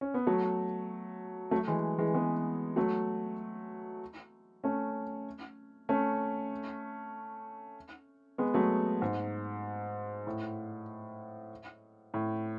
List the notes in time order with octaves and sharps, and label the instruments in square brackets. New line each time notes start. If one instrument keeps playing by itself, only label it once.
[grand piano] C#4
B3
F#3 A3
F#3 A3
E3 G#3
E3 G#3
G#3 B3
F#3 A3
A3 C#4
A3 C#4
G#3 B3
F#3 A3
G#2
A2
A2